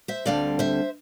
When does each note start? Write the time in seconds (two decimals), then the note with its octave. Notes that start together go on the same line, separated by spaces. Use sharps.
0.08 C5 E5
0.25 D2 D3 G3 C4 D5 F5
0.59 C5 E5